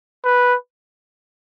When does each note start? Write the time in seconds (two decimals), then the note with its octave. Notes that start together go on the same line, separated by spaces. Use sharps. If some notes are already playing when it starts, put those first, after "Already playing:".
0.24 B4